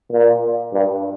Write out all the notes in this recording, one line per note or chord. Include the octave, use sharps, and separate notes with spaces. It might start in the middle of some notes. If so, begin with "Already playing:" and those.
A#2
G2